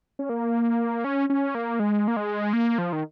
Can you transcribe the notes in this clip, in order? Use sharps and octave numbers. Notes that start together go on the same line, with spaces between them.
C#4
A#3
C#4
C#4
A#3
G#3
A#3
G#3
A#3
F3
D#3